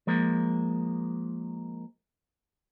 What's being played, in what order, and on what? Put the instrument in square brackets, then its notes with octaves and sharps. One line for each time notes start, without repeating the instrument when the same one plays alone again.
[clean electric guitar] F3 G#3 A#3